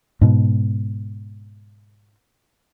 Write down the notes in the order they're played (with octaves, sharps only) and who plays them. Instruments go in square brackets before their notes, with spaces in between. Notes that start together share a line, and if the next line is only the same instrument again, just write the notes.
[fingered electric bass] G#2 B2